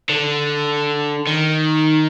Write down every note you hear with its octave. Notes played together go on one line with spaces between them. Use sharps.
D3
D#3